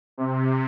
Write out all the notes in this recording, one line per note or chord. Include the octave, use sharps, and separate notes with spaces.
C3